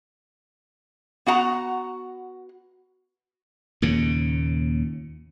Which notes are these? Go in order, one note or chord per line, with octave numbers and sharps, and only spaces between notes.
B3 F#4 F#5 A#5
D#2 A#2 C#3